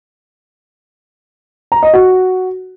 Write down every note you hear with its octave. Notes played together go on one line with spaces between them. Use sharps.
A#5
D#5
F#4